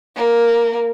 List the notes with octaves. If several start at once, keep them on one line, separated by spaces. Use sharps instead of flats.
A#3